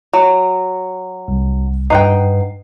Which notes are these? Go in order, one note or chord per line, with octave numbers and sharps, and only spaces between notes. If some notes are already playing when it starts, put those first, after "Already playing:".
F#3
C2
G2 D#4 B4 F#5 G5 C7